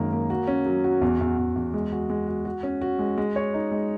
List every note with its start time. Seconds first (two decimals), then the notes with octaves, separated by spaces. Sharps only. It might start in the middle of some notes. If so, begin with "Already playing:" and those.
Already playing: F#2 D#3 G#3 A#3
0.13 A#3
0.30 F#4
0.48 C#4
0.66 F#3
0.84 F#4
1.01 E2
1.21 E2
1.38 E2
1.56 E2
1.74 G#3
1.92 F#4
2.10 G#3
2.28 F#4
2.45 F#4
2.63 C#4
2.81 F#4
2.99 G#3
3.18 G#3
3.36 C#5
3.54 D#4
3.72 G#3